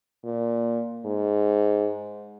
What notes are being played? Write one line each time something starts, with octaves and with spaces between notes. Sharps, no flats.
A#2
G#2